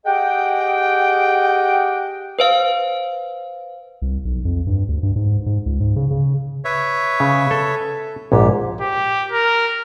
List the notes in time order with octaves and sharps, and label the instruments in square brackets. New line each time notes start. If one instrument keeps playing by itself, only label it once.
[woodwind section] G4 G#4 D#5 F#5 G5
[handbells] B4 C5 F5
[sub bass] C2
B1
F2
G2
D2
G2
G#2
G#2
C#2
G#2
C#3
C#3
[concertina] B4 C#5 E5
[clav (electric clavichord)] C#3
A4
[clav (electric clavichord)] A#1 G#2 [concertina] G4
[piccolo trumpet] G4
A#4